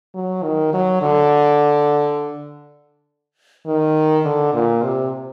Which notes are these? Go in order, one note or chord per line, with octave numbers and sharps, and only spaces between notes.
F#3
D#3
F#3
D3
D#3
D3
A#2
C3